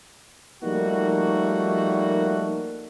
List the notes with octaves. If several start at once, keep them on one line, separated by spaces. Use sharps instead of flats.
F3 G3 A3 A#3 D#4 F#4